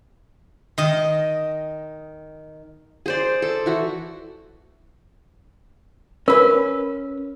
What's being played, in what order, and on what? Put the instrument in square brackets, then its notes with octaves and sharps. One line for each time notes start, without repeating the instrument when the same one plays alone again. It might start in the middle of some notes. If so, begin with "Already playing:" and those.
[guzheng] D#3 D#5
[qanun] G#4 C5 D5
A4
E3 F#4
[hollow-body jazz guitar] C#4 B4 [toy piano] A#4